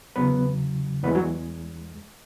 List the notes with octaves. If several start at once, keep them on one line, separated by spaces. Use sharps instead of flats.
E2 C#3 F#3 B3 B4
E2 E3 G#3 B3 B4
F#3 F#4